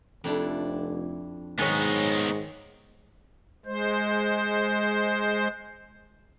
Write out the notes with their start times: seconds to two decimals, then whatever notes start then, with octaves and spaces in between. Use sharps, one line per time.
0.24 F1 F2 D4 E4
1.59 G#2 D#3 G#3 B3 D#4 C#5 G#5
3.66 G#3 C5